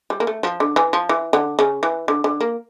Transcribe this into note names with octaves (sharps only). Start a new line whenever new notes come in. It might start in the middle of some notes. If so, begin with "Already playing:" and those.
G3
A#3
A3
F3
D3
E3
F3
E3
D3
C#3
E3
D3
D3
A#3